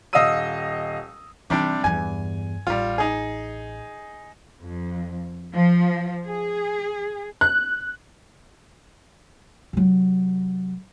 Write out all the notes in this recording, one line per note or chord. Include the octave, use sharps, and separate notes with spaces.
D#1 D#5 F5 D#6 E6 D#7
C3 E3 G3 D4
E2 G2 G#5
A1 G3 F4
D#4 G#4
F2
F3
G#4
F#6
C3 F#3